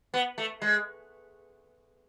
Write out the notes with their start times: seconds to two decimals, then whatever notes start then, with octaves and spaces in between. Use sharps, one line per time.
0.14 B3
0.38 A3
0.62 G#3